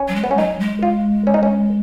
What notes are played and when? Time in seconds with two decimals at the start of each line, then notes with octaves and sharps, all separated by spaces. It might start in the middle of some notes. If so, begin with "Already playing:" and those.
Already playing: C#4
0.08 F#3
0.16 G#3
0.24 B3
0.31 C#4
0.37 F#3 D#4
0.60 G#3
0.83 F4
1.27 C#4
1.34 D#4
1.43 C#4